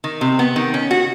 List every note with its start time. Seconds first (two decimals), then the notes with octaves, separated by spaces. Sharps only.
0.04 D#3
0.21 C3
0.39 B3
0.56 D#3
0.74 C#4
0.91 F#4